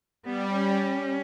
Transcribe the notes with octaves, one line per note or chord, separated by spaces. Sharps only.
G3 B3
C#4